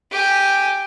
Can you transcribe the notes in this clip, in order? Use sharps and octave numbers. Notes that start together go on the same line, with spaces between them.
G4 G#5